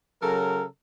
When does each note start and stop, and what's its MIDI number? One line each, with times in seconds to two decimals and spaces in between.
0.21 0.63 49
0.21 0.63 54
0.21 0.63 69
0.21 0.63 70